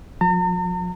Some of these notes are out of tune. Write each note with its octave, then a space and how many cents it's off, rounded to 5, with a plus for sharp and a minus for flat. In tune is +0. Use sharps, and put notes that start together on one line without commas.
F3 +40 A#5 -45